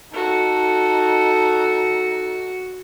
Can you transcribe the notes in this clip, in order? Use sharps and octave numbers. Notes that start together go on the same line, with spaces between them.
D#4 F#4 A4